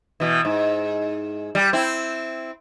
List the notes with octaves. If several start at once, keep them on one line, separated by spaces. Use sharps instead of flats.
B2 E3
G#2
G3
C4 E4